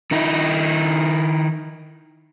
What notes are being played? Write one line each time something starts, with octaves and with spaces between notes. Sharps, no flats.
D#3 D#4 E4